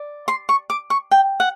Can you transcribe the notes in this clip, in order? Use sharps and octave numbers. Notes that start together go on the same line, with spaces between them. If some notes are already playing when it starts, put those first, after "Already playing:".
Already playing: D5
C6
C#6
D6
C#6
G5
F#5